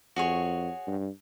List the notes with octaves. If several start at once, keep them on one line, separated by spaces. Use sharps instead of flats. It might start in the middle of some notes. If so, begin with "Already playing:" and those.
F2 F#4 G#4 C#5
G2